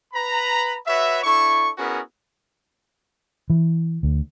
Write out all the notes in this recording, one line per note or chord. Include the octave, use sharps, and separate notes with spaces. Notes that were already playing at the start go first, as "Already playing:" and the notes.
B4 A#5 B5
F#4 B4 C#5 E5
D4 E4 A4 C#6
B3 C#4 E4 F#4 G#4 A#4
E3
D2